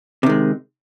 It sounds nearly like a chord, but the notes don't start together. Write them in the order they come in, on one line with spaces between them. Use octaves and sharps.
C3 D#3 G#3